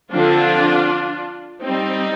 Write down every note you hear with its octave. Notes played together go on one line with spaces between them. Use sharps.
D3 F3 C4 D4 F4
G3 C4 D#4